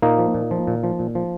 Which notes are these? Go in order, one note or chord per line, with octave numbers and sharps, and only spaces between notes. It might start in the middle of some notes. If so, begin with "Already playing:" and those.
A#2 A#3 D#4
F3
A#2
F3
A#2
F3
A#2
F3